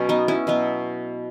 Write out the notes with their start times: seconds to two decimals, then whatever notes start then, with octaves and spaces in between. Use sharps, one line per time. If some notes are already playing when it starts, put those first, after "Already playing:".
Already playing: B2 F#3 C#4
0.09 B3 D#4
0.28 C#4 E4
0.47 B2 F#3 B3